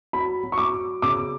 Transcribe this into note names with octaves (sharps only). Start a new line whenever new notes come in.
F#3 B5
F#3
C#6
D6
F#3
C#3 D6